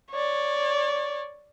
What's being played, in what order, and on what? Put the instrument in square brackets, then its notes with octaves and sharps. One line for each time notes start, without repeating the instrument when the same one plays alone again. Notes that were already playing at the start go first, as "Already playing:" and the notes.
[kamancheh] C#5 D5